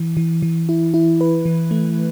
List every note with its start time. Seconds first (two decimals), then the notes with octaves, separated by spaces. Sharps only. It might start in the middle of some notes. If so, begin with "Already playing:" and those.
Already playing: E3
0.17 E3
0.42 E3
0.69 E4
0.94 E4
1.21 B4
1.46 E3
1.71 A3